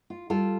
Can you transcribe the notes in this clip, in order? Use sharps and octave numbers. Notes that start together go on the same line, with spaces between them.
F4
G3 F4 A4